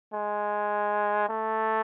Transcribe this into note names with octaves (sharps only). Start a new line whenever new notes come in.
G#3
A3